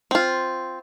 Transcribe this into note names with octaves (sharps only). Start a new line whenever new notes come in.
C4 F4